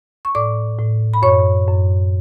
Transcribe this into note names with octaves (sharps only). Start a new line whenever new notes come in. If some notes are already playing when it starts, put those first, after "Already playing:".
C#6
A2 D5 D6
A2
B5
F#2 C#5 C#6
F#2